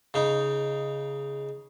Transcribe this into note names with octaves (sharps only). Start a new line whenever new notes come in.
C#3 D#4